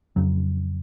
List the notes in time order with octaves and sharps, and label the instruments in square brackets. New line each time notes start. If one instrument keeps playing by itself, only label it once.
[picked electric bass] F2 C#3 F#3